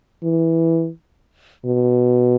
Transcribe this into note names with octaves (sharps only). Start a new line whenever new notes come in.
E3
B2